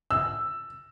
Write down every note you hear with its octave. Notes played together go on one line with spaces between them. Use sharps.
E6